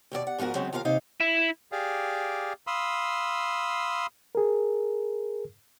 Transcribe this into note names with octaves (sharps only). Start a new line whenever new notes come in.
D#2 B2 F#4 D5
F#5
G#2 F3 B3 F#4 A#4
C#3 F#3 G#3 C4 C#4
D#2 F4 A#4 B4 F5
D#2 C3 D#4 F5
E4
G4 G#4 D5 F5
F5 B5 C6 D#6 E6
G#4 A#4